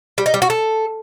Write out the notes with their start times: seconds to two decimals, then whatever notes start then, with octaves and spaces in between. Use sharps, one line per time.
0.18 G3
0.26 D#4
0.34 G3
0.42 F#4
0.50 A4